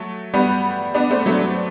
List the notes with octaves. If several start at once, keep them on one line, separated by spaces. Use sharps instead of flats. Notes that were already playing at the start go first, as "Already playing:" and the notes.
Already playing: F#3 A3
G3 B3
B3 D4
A3 C4
F#3 A3
F#3